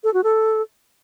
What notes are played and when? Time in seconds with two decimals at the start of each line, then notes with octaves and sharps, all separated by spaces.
0.04 A4
0.14 F#4
0.24 A4